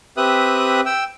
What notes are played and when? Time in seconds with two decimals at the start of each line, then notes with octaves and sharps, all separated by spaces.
0.17 C4 G4 B4 E5 D#6 F#6
0.86 G5 E6